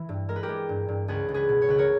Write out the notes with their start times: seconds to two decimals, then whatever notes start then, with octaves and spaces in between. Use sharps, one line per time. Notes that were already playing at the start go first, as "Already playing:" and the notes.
Already playing: E3 E4
0.09 G2
0.28 G#3 A#4
0.36 B4
0.43 G4 A#4
0.49 G#3
0.69 G2
0.88 G2
1.08 C#2 G#4 B4
1.29 C#2
1.34 G#4 B4
1.49 B2
1.62 C#5
1.69 C#2 B4
1.78 A#4 C#5